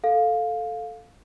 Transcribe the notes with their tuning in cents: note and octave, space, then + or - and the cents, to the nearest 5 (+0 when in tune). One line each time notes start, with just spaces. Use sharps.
A4 +0 F5 +10